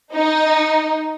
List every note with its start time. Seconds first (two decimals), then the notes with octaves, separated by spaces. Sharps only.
0.14 D#4